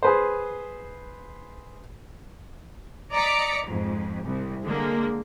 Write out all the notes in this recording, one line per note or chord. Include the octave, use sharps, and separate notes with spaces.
G#4 B4 C5
D5 D#5 A#5 D6 B6 C#7
F2 G#2
C2
D3 G#3 A#3